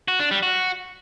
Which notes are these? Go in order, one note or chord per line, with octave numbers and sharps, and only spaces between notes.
F#4
D4
G3
F#4